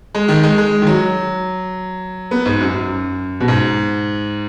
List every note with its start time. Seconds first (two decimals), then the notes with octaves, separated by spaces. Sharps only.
0.15 G#3
0.28 D#3
0.43 G#3
0.58 G#3
0.82 D#3
0.87 F#3
2.31 B3
2.46 G#2
2.60 F#2
2.75 F#2
3.40 B2
3.48 G#2